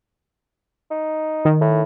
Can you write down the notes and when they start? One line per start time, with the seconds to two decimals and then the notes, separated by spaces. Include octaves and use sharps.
0.91 D#4
1.45 D#3
1.61 A2